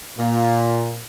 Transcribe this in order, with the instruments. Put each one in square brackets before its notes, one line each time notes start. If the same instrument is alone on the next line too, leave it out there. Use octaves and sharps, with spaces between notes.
[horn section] A#2